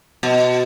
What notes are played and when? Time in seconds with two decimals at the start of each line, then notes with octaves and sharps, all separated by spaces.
0.23 B2